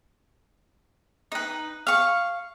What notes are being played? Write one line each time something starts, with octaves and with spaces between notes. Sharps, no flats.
D#4 B4
F5 C#6